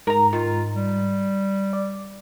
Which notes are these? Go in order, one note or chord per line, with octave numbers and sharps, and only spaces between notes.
G#2 A#4 A#5
D#3 F4
G3
D5